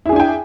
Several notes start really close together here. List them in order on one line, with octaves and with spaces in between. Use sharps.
E4 G#4 D4 G#5 G5